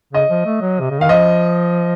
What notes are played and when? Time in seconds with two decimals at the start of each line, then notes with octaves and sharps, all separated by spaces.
0.13 C#3 D#5
0.30 F3
0.46 A3
0.61 F#3
0.81 C3
0.91 C#3
1.00 D#3 F5
1.09 F3 D#5